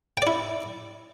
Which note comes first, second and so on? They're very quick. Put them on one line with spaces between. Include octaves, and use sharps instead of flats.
G5 D5 E4